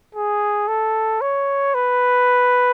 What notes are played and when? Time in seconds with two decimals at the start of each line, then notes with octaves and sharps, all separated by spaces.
0.15 G#4
0.68 A4
1.21 C#5
1.75 B4